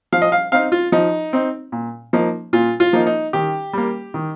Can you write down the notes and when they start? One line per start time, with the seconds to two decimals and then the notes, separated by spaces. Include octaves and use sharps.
0.12 F3 F5
0.22 D#5
0.32 F5
0.52 C4 D#4 F5
0.72 F4
0.92 F3 D#4
1.33 C4 D#4
1.72 A#2
2.13 F3 A#3 D#4
2.53 A#2 F4
2.80 F4
2.93 F3 A#3 D#4
3.06 D#4
3.33 D#3 G4
3.73 G3 A#3
4.14 D#3